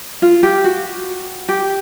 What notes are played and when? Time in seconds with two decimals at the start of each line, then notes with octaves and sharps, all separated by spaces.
0.22 F4
0.43 G4
0.64 F#4
1.49 G4